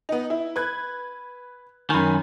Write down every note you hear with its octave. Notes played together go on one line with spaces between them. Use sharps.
B3 D#4
E4
B4 F#6 G#6
F#2 D#3 G#5 B5